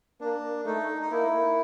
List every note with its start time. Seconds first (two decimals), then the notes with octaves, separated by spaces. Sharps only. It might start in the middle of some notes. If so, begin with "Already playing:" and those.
0.21 A#3 D4
0.66 A3 D#4
1.02 D#4
1.11 A#3 E4